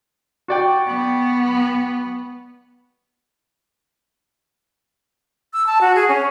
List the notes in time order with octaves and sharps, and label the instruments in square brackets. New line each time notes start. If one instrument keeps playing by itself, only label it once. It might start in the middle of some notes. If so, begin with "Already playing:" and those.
[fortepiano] F#4 D5 G5
[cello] B3
[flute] E6
A5
F#4
G#4
C#4